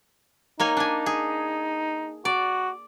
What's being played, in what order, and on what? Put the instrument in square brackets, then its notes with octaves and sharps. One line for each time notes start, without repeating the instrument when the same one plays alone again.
[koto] A#3 C#5 G#5 [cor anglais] D#4
[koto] D4 G#5
G#4
[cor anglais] F#4 [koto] D5